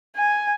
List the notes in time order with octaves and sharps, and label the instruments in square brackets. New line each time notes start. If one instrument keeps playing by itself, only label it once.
[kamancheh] G#5